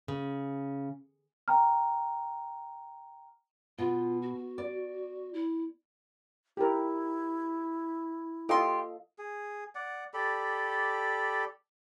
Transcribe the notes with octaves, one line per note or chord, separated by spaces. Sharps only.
C#3
G5 A#5 F6
B2 F4
F#4
D5
E4
E4 G4 A#4
F4 G4 A4 D#5 C6
G#4
D5 F#5
G4 A4 D5 B5